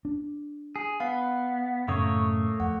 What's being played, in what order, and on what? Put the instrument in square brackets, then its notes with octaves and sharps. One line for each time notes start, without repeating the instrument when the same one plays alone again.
[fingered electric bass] D4
[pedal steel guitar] G#4
[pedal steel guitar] B3 [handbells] F5
[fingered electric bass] F#2 A2 C#3 [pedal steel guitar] A3 A#3 C#5 [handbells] D#6
[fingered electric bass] F2 [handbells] F#5